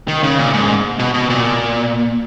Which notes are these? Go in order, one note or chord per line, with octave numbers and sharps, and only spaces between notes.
D#3
C#3
A#2
G#2
B2
B2
A#2